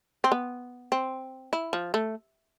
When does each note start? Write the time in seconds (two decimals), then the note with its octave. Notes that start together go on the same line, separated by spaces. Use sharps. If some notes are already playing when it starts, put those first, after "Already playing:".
0.24 C4
0.32 B3
0.92 C4
1.53 E4
1.73 F3
1.94 A3